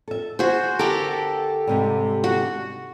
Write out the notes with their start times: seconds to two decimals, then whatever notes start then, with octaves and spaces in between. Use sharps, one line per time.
0.08 A4 E5
0.39 F#4 G#4 C5
0.79 D3 G4 A4 A#4
1.67 G#2 C3 G3
2.24 F#4